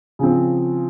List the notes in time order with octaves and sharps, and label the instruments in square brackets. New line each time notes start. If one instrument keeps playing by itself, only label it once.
[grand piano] C#3 F3 C4